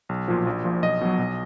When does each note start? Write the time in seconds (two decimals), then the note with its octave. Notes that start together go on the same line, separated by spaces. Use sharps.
0.09 B1
0.28 A#2 F3
0.47 A#1
0.64 A#2 F3
0.83 B1 D#5
1.01 B2 F#3
1.19 B1